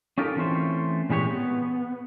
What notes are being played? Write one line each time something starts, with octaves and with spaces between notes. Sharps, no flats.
C#4 D#4 F4 G4 A4 A#4
D3 E3 A3 C4 C#4 C5
A#2 E3 G#3 G4 C#5
B3